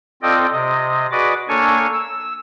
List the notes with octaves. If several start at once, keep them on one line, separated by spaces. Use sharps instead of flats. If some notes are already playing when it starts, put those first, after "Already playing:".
C4 F4 A4 D5 D#5 G5
C3 D#5
F#4 G#4 B4 D5 D#5 D6
A#3 D4 A4 C#5 G#5 C#6
E6